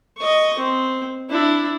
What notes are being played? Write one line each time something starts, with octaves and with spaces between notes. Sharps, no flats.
D#5 C#6
C4
D4 E4